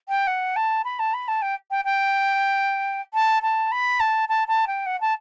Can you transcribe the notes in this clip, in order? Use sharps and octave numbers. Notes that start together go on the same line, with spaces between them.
G5
F#5
A5
B5
A5
B5
A5
G5
G5
G5
A5
A5
B5
A5
A5
A5
G5
F#5
A5